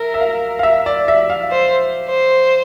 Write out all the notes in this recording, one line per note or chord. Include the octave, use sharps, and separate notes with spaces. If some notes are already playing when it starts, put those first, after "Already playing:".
Already playing: A#4 E5
E5
F5
F5
E5
D5
E5
F5
C5
C5